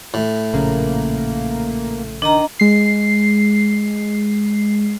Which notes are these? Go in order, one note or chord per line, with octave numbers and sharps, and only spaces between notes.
A2
A#1 C#3 A#3
D#3 D4 D#5 A#5
G#3 C7